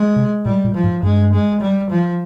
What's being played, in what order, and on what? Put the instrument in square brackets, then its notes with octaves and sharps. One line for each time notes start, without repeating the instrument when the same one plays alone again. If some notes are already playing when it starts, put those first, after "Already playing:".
Already playing: [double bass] G#3
[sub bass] C3
[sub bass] A#2 [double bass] G3
[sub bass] A#2
[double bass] F3
[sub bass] G#2
[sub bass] G2 [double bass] G#3
[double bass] G#3
G3
F3